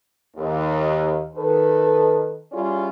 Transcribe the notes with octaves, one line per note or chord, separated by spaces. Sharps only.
D#2
D#3 A4 B4
G3 C#4 E4 F4 G#4 D5